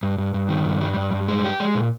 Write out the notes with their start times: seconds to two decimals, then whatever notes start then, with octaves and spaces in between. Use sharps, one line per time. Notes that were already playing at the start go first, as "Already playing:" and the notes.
0.03 G2
0.18 G2
0.34 G2
0.49 D#3
0.65 G2
0.81 G3
0.96 G2
1.13 G2
1.28 G#3
1.45 G4
1.60 G#3
1.75 A#2